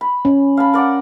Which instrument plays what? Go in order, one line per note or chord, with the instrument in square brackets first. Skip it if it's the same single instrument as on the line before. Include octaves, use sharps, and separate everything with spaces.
[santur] B5
[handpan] C#4
[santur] F5 A5 B5
A#4 D5 F#5